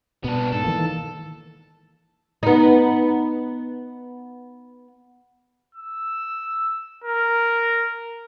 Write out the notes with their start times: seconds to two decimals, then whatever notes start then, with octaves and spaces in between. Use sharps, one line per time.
0.24 B2 B3 D4
0.52 G#2 A4
0.65 D#3 E3 A#3
2.43 B3 D#4
5.75 E6
7.04 A#4